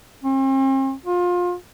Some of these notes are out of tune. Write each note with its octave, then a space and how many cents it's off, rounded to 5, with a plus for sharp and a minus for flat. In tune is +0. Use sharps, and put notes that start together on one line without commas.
C4 +45
F4 +25